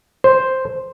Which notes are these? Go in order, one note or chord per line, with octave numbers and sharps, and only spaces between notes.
C5